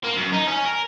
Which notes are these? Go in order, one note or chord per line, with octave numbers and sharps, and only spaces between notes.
A#3
F#2
D#4
C#4
A#4